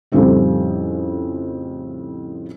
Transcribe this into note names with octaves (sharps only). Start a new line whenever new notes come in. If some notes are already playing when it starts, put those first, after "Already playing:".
F2 A2 C#3 G3 C4 D#4